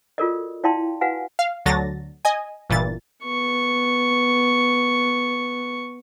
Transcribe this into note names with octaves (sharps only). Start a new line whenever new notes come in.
F4 F#4 A4 A#4 D5 D#5
E4 D5 F5 G5 A5 C6
F#4 B4 F5 F#5 G#5
F5
D2 D3 F#3 A6 A#6
D#5 G#5
G1 A#2 E3 A6
B3 C#6